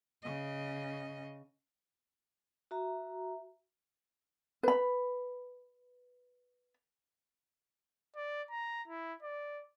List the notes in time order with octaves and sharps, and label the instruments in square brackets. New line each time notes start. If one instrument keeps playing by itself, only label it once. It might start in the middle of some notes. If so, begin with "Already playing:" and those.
[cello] C#3 D#5
[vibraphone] F#4 E5 A#5
[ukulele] B4 B5
[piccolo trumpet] D5
A#5
E4
D5